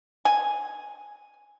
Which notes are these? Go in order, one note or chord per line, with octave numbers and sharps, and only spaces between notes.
G#5